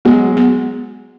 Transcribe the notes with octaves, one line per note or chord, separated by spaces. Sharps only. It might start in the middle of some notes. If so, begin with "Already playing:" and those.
F#3 G#3 B3
B3